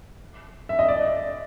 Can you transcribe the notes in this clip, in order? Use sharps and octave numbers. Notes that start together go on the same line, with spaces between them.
E5
D#5
D5